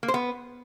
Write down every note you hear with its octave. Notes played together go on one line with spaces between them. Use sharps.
A#3
C5
B3